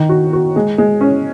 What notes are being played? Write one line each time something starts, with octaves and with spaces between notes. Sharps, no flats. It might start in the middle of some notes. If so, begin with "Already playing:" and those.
Already playing: D#3
F#4
F#4
G#3
G#3
C#4